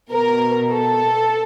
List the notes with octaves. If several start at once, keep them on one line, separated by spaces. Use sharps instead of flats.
B2 A#4
A4